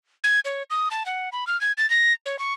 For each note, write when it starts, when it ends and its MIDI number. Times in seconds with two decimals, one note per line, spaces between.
0.24 0.40 92
0.45 0.63 73
0.70 0.89 87
0.91 1.06 81
1.06 1.29 78
1.32 1.47 83
1.47 1.59 89
1.61 1.72 92
1.78 1.89 93
1.90 2.13 94
2.26 2.39 73
2.39 2.53 85